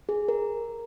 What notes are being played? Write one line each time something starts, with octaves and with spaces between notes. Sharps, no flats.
G#4
A#4